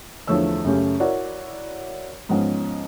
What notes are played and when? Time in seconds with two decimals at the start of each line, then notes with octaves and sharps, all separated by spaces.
0.27 E2 D3 F3 A3 C#5 E6
0.65 F#2 C#3 A3 C#4 G4
1.00 E4 F#4 A#4 C#5 D5
2.29 G#2 F3 G#3 B3 C#4